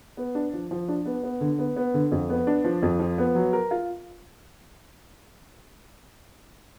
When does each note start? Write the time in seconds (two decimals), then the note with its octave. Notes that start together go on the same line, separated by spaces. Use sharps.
0.17 B3
0.35 D4
0.53 F3
0.71 F3
0.88 D4
1.06 B3
1.24 B3
1.41 D3
1.59 B3
1.76 B3
1.94 D3
2.12 F2
2.30 B3
2.47 D4
2.64 F3
2.83 F2
2.99 F3
3.18 B3
3.35 F#3
3.53 A#4
3.71 F4